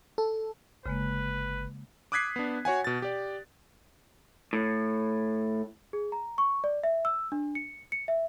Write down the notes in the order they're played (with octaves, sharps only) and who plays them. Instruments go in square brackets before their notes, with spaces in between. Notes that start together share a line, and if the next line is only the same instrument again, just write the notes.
[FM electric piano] A4
[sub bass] G1 [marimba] C#3 G#3 A#3 [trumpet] B4
[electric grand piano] D6 D#6 F#6 G#6 B6 C7
B3 D4
F#4 C#5 F#5 G#5
B2 A6
G4 D5
[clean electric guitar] A2
[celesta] G#4
A#5
C#6
D5
E5
E6
D4
C#7
C#7
E5